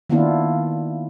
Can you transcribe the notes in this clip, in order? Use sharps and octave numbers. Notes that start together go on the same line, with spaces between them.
D#3 A#3 B3 D4 E4 F4